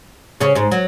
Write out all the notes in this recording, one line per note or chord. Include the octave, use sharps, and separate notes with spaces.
C#3 C#4
G#2 G#3
F#3